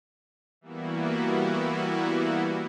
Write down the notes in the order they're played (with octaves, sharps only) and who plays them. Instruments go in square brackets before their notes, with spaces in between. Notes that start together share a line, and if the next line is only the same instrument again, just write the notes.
[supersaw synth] E3 G3 A#3 B3 E4 F#4